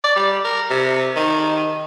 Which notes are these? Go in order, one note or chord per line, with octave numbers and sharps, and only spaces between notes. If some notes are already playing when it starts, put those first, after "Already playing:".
D5
G3
A#4
C3
D#3